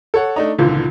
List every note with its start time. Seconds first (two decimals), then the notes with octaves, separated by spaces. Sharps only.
0.14 A4 C#5 F#5
0.36 A3 D4 D#4
0.58 G#1 C#2 A#2 D3 E3